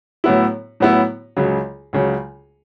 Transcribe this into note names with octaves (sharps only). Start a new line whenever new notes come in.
A2 F#3 B3 E4
A2 F#3 B3 E4
C#2 C#3 F#3
C#2 C#3 F#3